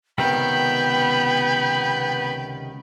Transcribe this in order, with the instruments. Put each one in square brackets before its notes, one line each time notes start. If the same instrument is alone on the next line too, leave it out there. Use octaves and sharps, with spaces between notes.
[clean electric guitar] C#2 C3 D#3 [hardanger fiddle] B3 [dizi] G5 [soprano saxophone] B5